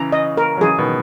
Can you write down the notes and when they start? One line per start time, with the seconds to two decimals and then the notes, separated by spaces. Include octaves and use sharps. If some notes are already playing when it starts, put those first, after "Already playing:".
Already playing: C#3 E3 A#5
0.12 D#5
0.37 A#4
0.57 F#3
0.61 C#3 E3 G#4
0.78 B2 D#3